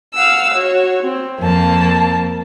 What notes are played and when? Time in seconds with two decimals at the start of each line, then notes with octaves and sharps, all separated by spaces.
0.14 F5 F#5 E6
0.55 F#4 C#5
1.04 C4
1.39 F2 A#3 A5